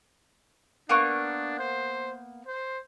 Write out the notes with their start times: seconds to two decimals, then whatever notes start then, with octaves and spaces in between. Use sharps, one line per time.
0.89 A#3 B3 D4 C#6
1.59 C5
2.47 C5